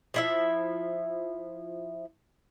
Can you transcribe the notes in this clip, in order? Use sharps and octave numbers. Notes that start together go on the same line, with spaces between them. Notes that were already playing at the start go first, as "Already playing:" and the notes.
F3 E4 E5